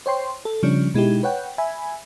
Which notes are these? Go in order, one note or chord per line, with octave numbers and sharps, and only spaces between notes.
C5 C#5 G5 C6
A4
C#3 F3 G3 C#4 D4
B2 G#3 D#4 E4 G4
B4 C#5 F#5 G5
E5 G#5 B5